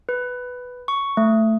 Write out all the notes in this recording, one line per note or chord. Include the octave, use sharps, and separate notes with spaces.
B4
C#6
A3